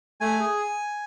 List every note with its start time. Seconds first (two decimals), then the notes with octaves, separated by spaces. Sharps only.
0.20 A3 G#5
0.40 G#4